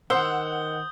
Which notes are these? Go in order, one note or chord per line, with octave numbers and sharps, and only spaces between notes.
D#3 C5 F#5 D#6 E6 G6 G7